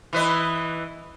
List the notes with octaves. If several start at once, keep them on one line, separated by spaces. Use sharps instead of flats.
E3 B4 D#5